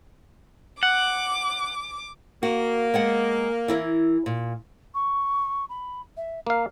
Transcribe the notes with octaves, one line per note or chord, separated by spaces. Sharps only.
F#5 D6
A#3 F#4
G#3 B3 F#5
E3 E4 A#4
A#2
C#6
B5
E5
A#3 F5 A#5